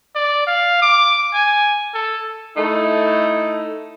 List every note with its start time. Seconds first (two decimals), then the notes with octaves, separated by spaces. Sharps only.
0.15 D5
0.47 F5
0.82 D6
1.34 G#5
1.94 A4
2.57 A3 D#4 E4 A4